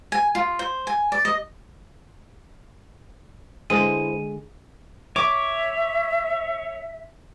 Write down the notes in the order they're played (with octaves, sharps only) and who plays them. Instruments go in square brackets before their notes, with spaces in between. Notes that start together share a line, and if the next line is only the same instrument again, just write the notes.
[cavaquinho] G#5
F4
C5
G#5
D5
D#5
[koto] D3 G#3 [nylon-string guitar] E4 B4 C5 [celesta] D#7
[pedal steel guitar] C#5 [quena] E5 [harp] D6